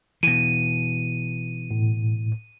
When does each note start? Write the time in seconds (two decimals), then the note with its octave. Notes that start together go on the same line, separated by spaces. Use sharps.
0.23 B2 E3 D#7
1.71 A2